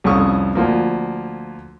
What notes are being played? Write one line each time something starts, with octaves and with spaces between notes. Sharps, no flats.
C2 F2 C#4 C#6 D#6
D2 F3 A#3